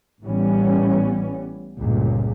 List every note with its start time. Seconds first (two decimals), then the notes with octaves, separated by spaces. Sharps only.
0.23 A1 A2 E3 G3 B3 C#4
1.78 G1 C#2 A#2